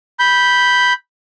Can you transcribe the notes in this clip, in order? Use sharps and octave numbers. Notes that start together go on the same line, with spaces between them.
B5 G6